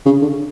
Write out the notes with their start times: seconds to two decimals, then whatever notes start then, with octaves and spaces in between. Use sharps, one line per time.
0.06 C#3
0.21 D3